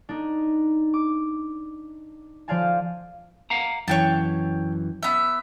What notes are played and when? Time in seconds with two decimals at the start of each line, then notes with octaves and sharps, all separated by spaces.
0.09 D4 D#4
0.94 D6
2.48 F3 C5 D5 F5 G#5 A5
3.50 F5 F#5 A#5
3.88 F#2 E3 C#5 G5 A5
5.03 B3 E5